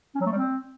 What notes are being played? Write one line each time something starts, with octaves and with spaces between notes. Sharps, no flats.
C#4
F#3
A3
G3
C4